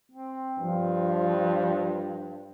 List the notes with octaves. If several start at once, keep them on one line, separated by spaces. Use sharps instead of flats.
C4
G2 F3